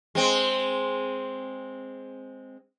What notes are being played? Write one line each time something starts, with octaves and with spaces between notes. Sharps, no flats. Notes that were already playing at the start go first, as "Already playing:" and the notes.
G#3 C4